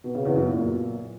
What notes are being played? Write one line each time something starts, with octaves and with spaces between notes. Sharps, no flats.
B2
C#3
E2
F#2
A#2